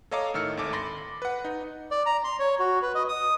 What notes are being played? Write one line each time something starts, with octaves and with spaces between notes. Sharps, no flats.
A4 C#5 D#5 F5 A#5 D6
A2 D#3 E6 F6 C#7
G#1 D2 A4 D6
B5 C6 D6 A6 A#6
B4 F#5
D#4
D5
A#5
C6
C#5
F#4
B4
D#5
D#6